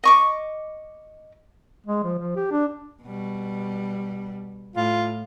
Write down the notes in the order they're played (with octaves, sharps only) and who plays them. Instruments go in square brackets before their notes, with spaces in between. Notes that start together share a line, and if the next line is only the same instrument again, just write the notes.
[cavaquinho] D#5 C#6 D6
[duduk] G#3
F3
F3
G4
D4
[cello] B2 G3
[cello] A2 [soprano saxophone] F4